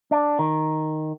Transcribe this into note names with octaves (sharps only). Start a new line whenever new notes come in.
D4
D#3